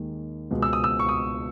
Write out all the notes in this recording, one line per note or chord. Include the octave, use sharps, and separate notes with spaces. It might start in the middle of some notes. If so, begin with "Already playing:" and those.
Already playing: D#2 D#3 G#3
C#2 B2 G#3
E6
D#6
E6
C#6
D#6